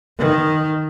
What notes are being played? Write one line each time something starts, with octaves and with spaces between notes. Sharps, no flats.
D#3